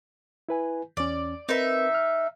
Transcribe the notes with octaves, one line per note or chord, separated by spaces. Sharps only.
E4 B4 G#5
E2 C#4 D5
C4 D#4 A#4 B4 E5
F6